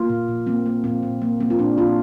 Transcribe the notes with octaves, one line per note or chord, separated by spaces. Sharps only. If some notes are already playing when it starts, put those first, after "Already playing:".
Already playing: A#3 F4
A#2
A#2
A#3 C4
A#3
A#2 C4
A#2
A#3
A#3 C4
F4
A#2 D4
A#2 F4